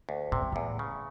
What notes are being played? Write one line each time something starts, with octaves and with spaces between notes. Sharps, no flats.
D2
A2 C3
G#2
E2 A2
C#3